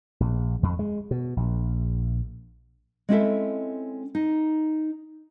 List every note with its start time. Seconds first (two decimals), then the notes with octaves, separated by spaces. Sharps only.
0.20 A#1
0.63 F2
0.79 G#3
1.11 B2
1.37 A#1
3.09 G#3 C4 C#4 E4 A4 E5
4.15 D#4